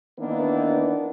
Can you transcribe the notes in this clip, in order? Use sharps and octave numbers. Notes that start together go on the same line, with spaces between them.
D#3 E3 A#3 B3 D4